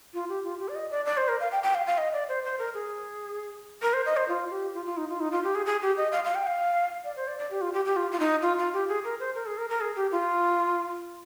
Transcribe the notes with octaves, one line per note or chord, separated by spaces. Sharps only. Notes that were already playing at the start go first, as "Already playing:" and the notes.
F4
G4
F4
G4
D5
D#5
D5
D5
C5
A#4
F5
G5
G5
F5
F5
D#5
D5
C5
C5
A#4
G#4
A#4
C5
D#5
C5
F4
G4
F4
F4
D#4
F4
D#4
F4
G4
G#4
G#4
G4
D#5
F5
F5
G5
F5
D5
C5
D5
D5
G4
F4
G4
G4
F4
F4
D#4
F4
F4
G4
G#4
A#4
C5
A#4
G#4
A#4
A#4
G#4
G4
F4